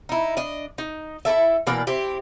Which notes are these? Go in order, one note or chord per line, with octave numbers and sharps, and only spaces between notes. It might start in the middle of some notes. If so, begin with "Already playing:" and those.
D#4 E4
D4 D#5
D#4
E4 G4 A4 E5
B2 E3 A#3 D5
C4 E4 G4